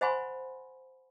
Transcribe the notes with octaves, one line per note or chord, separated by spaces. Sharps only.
C5 E5 F#5 G#5 B5 C6